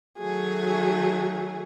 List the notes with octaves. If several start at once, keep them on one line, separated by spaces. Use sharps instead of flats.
D#3 F#3 A3 G#4